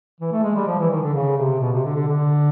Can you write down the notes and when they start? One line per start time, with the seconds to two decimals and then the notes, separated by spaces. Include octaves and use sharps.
0.21 E3
0.33 A3
0.43 G#3
0.55 G3
0.67 F3
0.79 E3
0.90 D#3
1.03 D3
1.14 C#3
1.38 C3
1.60 B2
1.73 C3
1.85 D3
1.96 D3
2.07 D3